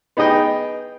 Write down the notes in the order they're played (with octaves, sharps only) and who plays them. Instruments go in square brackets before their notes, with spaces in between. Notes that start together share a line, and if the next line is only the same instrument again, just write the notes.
[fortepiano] B3 D#4 G#4 D#5 G5